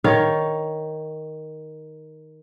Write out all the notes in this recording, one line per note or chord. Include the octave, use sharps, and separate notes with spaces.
D#3 C#5 F5